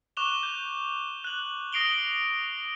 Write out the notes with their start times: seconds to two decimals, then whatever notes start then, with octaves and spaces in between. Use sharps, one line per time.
0.17 C#6 D6 F#6 E7 F7 G7
0.43 G6
1.24 F#6 F#7
1.72 D#6 A#6 C7 D7 F7 G7